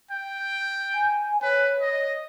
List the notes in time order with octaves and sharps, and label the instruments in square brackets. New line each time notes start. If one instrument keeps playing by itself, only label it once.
[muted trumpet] G5
[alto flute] G#5
[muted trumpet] B4 [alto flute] C#5
[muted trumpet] D#5